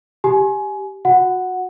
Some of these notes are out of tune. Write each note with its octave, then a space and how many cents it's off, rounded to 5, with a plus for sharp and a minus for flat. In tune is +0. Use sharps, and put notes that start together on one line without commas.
G4 +0 G#5 +20
F#4 -20 F#5 +0